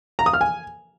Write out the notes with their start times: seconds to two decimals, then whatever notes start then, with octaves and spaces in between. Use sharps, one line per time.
0.19 A#5
0.26 D#6
0.33 F6
0.41 G#5